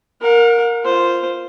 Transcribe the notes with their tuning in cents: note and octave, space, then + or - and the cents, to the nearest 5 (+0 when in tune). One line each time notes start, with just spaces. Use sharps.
A#4 +0 F#5 -45
F4 -5 C5 -5